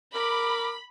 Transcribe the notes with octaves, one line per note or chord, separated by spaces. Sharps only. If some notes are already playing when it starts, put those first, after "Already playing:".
A#4 B5 D6